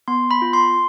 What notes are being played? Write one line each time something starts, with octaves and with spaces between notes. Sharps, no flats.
B3 C6
B5
F4
C6